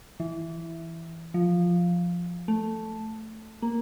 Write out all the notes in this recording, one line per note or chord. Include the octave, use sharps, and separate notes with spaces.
E3
F3
A3
A#3